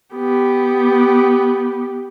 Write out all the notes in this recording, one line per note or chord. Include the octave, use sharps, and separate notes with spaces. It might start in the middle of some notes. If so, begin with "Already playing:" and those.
B3 G4